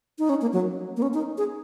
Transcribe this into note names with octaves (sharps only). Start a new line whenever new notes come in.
D#4
C#4
A#3
F#3
A#3
C#4
D#4
G#4